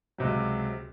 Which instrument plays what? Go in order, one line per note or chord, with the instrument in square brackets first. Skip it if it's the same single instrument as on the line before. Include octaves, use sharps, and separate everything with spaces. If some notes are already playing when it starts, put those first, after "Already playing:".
[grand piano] C#2 C3 F#3